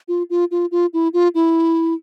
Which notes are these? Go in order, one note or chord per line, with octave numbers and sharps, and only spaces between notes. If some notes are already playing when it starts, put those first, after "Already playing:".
F4
F4
F4
F4
E4
F4
E4